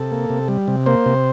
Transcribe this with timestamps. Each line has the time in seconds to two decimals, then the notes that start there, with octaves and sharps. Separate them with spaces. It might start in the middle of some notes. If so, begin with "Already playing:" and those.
Already playing: C3 A4
0.12 A#3
0.30 C3
0.48 G3
0.68 C3
0.86 A#3 C5
1.06 C3